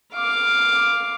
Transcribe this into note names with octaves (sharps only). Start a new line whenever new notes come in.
F5 D6